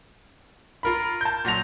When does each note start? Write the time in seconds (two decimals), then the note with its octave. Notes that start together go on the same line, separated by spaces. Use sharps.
0.83 F4 A#4 B5
1.21 A5 G6
1.45 A#2 F#3 A#6 F7